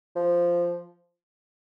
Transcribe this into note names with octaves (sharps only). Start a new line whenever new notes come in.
F3